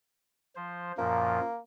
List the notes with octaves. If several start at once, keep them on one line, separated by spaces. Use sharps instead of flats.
F3 C5
F#2 A#2 F3 A#3